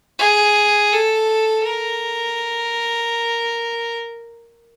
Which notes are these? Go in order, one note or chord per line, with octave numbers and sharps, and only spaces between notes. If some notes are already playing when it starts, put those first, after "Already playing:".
G#4
A4
A#4